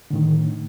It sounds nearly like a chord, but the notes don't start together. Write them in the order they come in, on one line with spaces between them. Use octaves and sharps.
D3 A2 D#3